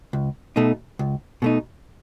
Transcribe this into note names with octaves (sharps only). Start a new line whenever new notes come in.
C#2
B2 A3 D#4
C#2
B2 A3 D#4